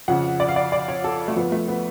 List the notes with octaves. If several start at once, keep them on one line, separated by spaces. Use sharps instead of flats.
F2 C#3 F3 F#5
D5
F5
D5
D5
C#5
A4
A3
F2 F3 B3
A3
B3